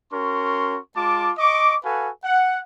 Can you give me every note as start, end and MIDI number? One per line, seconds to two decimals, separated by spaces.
0.13 0.78 61
0.13 0.78 66
0.13 0.78 70
0.13 0.78 84
0.13 0.78 85
0.96 1.32 56
0.96 1.32 65
0.96 1.32 81
0.96 1.32 86
1.38 1.76 75
1.38 1.76 85
1.38 1.76 86
1.85 2.10 66
1.85 2.10 69
1.85 2.10 71
1.85 2.10 77
1.85 2.10 80
2.24 2.60 78